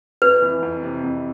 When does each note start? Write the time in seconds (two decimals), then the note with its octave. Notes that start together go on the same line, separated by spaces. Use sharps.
0.22 F2 B4
0.42 E3
0.63 F2
0.83 C3
1.04 F2